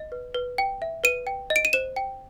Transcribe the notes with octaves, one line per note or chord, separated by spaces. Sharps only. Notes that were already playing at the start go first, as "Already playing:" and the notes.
Already playing: D#5
B4
B4
G5
E5
B4 D#7
G5
D#5
D7
D#7
C5 E7
G5